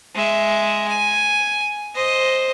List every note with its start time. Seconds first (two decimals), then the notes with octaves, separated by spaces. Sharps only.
0.15 G#3 E5
0.88 G#5
1.95 C5 D#5